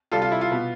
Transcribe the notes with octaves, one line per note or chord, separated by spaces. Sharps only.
C3 G3 C4 F4 A4
F4
E4
F4
B2 B3